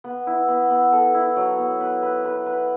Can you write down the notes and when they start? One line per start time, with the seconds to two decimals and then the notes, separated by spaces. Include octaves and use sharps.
0.04 B3
0.27 E4
0.48 B3
0.70 B3
0.92 A4
1.14 E4
1.36 F#3
1.58 B3
1.81 B4
2.02 B4
2.25 B4
2.46 B4